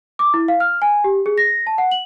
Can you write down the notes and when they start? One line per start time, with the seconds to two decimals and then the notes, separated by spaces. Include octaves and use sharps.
0.19 D6
0.34 E4
0.48 F5
0.60 F6
0.82 G#5
1.04 G4
1.26 G#4
1.38 A#6
1.67 A5
1.78 F#5
1.92 F#7